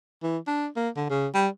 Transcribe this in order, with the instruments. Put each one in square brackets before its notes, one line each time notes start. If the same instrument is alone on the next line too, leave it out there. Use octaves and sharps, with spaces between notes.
[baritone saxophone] E3
D4
A#3
D3
C#3
G3